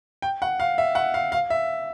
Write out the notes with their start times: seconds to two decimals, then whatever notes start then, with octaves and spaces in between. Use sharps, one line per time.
0.22 G5
0.42 F#5
0.60 F5
0.78 E5
0.95 F#5
1.14 F5
1.32 F5
1.50 E5